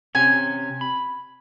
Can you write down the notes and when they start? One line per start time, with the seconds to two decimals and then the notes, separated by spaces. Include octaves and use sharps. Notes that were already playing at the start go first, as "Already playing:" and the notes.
0.15 C3 C#4 G#5
0.81 B5